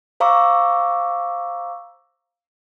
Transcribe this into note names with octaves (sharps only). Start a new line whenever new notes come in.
C5 F5 A#5 C#6 D6 E6